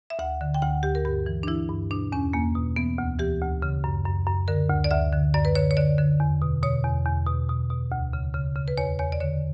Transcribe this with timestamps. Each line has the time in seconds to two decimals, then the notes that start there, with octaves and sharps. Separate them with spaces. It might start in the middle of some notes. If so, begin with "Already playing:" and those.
0.10 E5
0.19 D2 F#5
0.41 D3
0.54 G5
0.62 D2 F#5
0.83 D2 G4
0.95 A#4
1.05 G2 G4
1.26 E3
1.43 D4
1.48 E3 E4
1.69 G2
1.91 B2 D4
2.12 E2 C#4
2.33 E2 A#3
2.55 B2
2.76 E3 B3
2.98 D2
3.19 E3 G4
3.41 D2
3.62 C#3
3.84 F#2
4.05 F#2
4.27 F#2
4.48 D3 A#4
4.69 D2
4.84 D5
4.91 D2 E5
5.13 D3
5.34 F#2 D5
5.45 B4
5.55 D3 C#5
5.71 C#5
5.77 D3 D5
5.98 D3
6.20 E2
6.42 B2
6.63 B2 C#5
6.84 E2
7.06 E2
7.27 B2
7.49 B2
7.70 B2
7.92 D2
8.13 C#3
8.35 C#3
8.56 C#3
8.68 B4
8.78 E2 C#5
8.99 E2 C#5
9.12 D5
9.20 D3 C#5